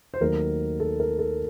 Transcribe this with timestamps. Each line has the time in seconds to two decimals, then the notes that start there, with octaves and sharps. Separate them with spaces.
0.14 C5
0.20 D#2 D#3 F#3 A3 A#4
0.80 A4
1.00 A#4
1.19 A4